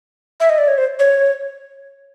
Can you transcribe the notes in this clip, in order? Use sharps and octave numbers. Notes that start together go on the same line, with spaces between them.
E5
D#5
D5
C#5
C5
C#5